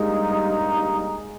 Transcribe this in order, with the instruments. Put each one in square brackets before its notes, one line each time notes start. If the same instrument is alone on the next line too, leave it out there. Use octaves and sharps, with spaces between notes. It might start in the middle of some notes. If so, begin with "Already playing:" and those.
Already playing: [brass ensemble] G2 G3 A#3 D#4 [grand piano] G#3